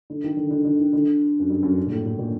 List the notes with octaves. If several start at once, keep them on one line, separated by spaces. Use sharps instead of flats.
D3
D#3
D3
D3
D3
D#3
D3
F#2
G2
F#2
G2
A#2
A2
A2
A#2